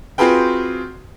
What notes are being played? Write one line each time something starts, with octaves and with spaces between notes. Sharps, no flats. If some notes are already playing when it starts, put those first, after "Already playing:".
C4 F4 F#4 G#4 B4 G5